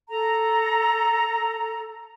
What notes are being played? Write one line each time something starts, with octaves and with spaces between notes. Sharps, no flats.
A4 A#5